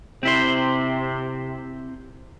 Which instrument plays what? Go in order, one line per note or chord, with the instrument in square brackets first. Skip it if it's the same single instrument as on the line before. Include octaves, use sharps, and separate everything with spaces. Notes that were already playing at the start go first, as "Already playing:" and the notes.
[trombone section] C3 [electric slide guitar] C4 E4 C5